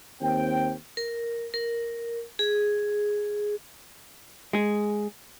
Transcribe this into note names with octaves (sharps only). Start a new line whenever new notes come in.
D#2 C4 G5
A#4
A#4
G#4
G#3 G#4